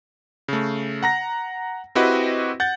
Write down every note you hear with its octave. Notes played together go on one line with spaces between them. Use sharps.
C#3 A3
F#5 A#5 A#6
C4 E4 F#4 G4 B4 D#5
F#5 G6 A6